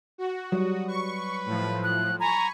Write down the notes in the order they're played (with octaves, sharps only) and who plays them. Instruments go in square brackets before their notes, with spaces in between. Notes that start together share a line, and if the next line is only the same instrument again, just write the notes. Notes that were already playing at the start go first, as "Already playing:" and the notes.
[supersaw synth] F#4
[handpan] F#3 G3 [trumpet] D#6
[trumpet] B4 [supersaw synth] C#6
[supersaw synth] A2 F3
[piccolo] F#6
[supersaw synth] G#5 C#6 [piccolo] A#5 [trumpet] B5